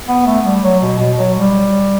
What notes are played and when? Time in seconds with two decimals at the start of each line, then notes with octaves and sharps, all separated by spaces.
0.08 B3
0.26 A3
0.44 G3
0.63 F#3
0.81 B2
0.99 B2
1.18 F#3
1.36 G3